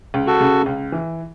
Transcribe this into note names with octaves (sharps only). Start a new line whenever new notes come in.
C#2
F#4 A4
C#3
C#2
E3